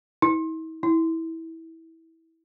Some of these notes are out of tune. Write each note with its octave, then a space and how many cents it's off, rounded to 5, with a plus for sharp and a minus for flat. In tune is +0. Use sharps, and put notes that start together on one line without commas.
E4 -45
E4 -20